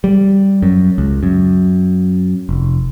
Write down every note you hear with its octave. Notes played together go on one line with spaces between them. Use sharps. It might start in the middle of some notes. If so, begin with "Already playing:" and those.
G3
F#2
C#2
F#2
F1